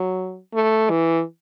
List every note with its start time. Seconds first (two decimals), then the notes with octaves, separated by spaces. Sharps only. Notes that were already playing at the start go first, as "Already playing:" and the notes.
Already playing: F#3
0.54 A3
0.90 E3